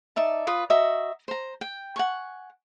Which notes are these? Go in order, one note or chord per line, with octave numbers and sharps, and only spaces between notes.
D#4 D5 E5 A5
F4 B4 D#6
F#4 D#5 E5 A#5
C5 A#5
G5
F#5 G#5 C#6